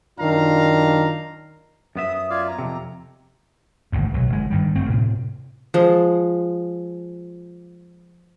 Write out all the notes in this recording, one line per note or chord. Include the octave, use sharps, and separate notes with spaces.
F#2 D#3 D4 F4 F5 A#5
F#2 B3 E5 D#6
F4 D5 F5 G#6
A#5
F2 C3 A4
G#1 D2 G2
B1 F#3
G1 G#3
G2 D#3 G3
F#1 A3 C4
A2 C3
F3 G#3